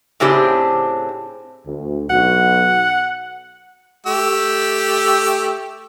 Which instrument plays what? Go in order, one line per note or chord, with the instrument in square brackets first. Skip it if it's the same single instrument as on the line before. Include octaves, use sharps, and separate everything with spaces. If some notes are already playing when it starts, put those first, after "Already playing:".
[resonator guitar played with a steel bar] A2 C#3 C4 D4 G4 G#4
[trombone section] D2
[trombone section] B1 F#4 [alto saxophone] F#5
[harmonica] A3 G4 E6